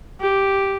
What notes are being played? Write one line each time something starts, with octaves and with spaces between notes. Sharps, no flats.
G4